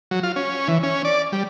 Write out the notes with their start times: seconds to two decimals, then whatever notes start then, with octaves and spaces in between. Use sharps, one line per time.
0.11 F#3
0.23 F4
0.36 C#4
0.68 E3
0.83 C#4
1.05 D5
1.32 G3